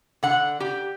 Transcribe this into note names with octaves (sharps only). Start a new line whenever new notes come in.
D3 F#5
G4